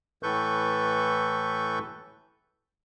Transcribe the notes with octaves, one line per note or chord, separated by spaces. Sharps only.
A2 E3 A4 B4 C#6 G6